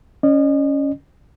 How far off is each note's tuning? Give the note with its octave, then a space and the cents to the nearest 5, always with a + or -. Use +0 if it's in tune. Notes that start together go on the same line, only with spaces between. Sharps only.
C#4 +5 D#5 -40